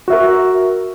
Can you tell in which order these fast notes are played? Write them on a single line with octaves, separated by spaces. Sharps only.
F#4 E5 A#4